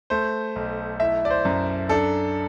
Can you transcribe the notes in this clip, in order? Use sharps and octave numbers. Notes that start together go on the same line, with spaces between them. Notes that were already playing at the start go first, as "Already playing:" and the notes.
A3 C5
B1
E4 E5
D5
C5
F#2
D4 A4